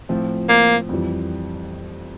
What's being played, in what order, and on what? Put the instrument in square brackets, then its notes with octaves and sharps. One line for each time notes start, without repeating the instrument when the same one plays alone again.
[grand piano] A2 F3 C4 F4
[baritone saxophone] A#3
[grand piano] F2 E3 G3